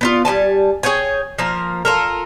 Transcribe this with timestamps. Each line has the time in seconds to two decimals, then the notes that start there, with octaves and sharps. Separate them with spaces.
0.01 B3 D#4 F4
0.25 G3 D#4 G#5 A5
0.83 G#4 C#5 G5 G#5
1.38 F3 A#3 A#4
1.85 F4 A4 A#4